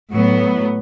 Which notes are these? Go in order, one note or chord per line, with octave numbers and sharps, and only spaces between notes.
A2 F#3 B3